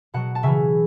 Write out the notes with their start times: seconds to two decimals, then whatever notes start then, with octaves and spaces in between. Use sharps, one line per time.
0.14 B2 F#3 F#5 A5
0.35 A5
0.43 C#3 E3 E5 G#5